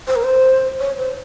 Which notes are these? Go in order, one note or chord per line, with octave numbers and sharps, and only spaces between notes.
C5
A#4
C5
C#5
C5